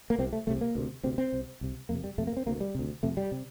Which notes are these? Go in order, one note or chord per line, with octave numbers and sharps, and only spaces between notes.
A#3
C2 C3 C4
A3
C2 C3 A3
A#3
D2 C3
D2 C3 C4
C4
C2 C3
C2 C3
F2 C3 A#3
G3
F2 C3 A3
A#3
C4
D2 C3 A#3
G3
D2 C3
F2 C3 A3
G3
C3